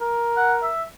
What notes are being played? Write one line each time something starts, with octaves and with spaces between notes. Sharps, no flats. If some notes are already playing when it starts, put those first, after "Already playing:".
A#4
F#5
E5